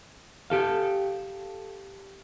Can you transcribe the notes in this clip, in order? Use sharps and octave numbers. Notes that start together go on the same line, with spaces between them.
G4 A4 F5